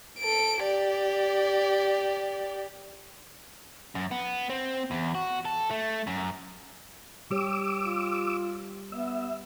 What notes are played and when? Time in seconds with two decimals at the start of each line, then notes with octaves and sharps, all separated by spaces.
0.19 A4 D7
0.62 G4 D5
3.95 F#2
4.11 B3
4.50 C4
4.91 E2
5.15 F#4
5.45 A4
5.70 A3
6.07 F#2
7.31 G3 G4 C#5 D6 E6
7.84 F4
8.92 B3 E5